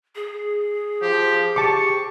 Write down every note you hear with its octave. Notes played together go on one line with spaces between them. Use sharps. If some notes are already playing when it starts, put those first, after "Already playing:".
G#4
F3 G4
G4 A5 C#6 D6